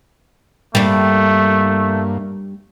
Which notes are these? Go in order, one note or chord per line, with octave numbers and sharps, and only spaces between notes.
G2 G3 A3 A#3 D4